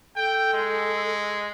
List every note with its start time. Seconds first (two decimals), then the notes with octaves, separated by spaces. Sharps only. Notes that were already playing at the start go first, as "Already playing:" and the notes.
0.16 A4 G5
0.53 G#3